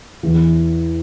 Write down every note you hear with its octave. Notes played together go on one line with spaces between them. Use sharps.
E2 E3